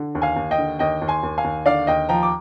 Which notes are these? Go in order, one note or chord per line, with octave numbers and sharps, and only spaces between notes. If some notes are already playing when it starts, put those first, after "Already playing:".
Already playing: D3
D#2
F5 G#5
D#2
D#5 G5
D3
D#2 D#5 G5
D#2
G#5 C6
D#2
F5 G#5
D#2
D3 D5 F5
D#2 D#5 G5
F3 G5 A#5
D6